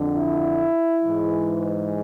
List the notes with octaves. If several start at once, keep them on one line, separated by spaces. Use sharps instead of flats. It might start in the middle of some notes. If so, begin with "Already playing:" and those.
Already playing: F2 D3
E4
G#2 E3